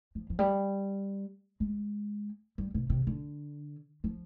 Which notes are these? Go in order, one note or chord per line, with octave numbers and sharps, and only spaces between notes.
F3
F3
G3
G#3
G3
B2
C3
D3
F3